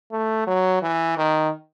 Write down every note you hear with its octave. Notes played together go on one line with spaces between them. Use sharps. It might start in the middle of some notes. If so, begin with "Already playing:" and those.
A3
F#3
E3
D#3